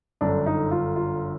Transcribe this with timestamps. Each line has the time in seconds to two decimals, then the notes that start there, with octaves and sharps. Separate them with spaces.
0.21 G1 F#2 D3 D4
0.46 D#4
0.71 F4
0.96 F4